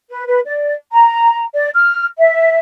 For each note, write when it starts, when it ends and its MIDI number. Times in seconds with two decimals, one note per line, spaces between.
0.10 0.26 71
0.26 0.40 71
0.46 0.75 74
0.92 1.44 82
1.54 1.69 74
1.74 2.06 89
2.18 2.59 76